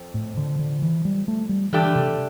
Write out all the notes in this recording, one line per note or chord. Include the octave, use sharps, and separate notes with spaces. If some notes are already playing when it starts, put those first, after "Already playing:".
Already playing: F2 F3 C4
A2
D3
D3
E3
G3
A3
G3
G2 D3 E3 A3 D4 G4
C3